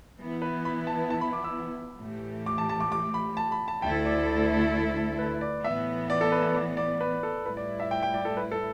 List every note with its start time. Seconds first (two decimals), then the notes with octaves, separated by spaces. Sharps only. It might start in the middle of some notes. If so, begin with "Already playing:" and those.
0.20 E3 B3 E4
0.42 B4
0.65 B5
0.87 A5
1.10 A5
1.21 B5
1.33 D6
1.44 E6
2.01 A2 E3 A3 G4
2.46 D6
2.58 A5
2.69 A5
2.80 D6
2.92 D6
3.14 B5
3.37 A5
3.52 B5
3.68 A5
3.82 D2 D3 A3 E4 A4 G5
4.05 D5
5.19 B4
5.41 D5
5.64 A2 E3 B3 E5
6.10 D5
6.21 A4
6.32 B4
6.55 D5
6.77 D5
7.01 B4
7.23 A4
7.46 A2 G3 E4 B4
7.57 D5
7.80 E5
7.91 G5
8.03 G5
8.14 D5
8.25 A4
8.37 B4
8.52 A4